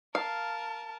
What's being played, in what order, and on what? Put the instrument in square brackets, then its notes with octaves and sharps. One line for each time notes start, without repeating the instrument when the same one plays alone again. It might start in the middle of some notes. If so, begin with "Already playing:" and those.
[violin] A#4 A5 [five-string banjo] F5